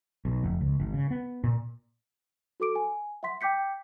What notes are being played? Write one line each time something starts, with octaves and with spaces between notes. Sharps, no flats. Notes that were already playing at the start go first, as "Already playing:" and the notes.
B1
F1
C#2
G#1
C#3
B3
A#2
F#4 A4 D6 D7
G#5
E5 F#5 C6 B6
G5 D6 G6 B6 C#7